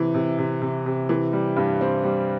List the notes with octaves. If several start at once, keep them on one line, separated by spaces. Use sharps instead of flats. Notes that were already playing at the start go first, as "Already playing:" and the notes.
Already playing: C3 E3
C3
C3
C3
C3
E3
G3
G2
C4
G3